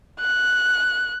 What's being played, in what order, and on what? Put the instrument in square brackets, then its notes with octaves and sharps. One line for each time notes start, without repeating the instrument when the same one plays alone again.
[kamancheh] F#6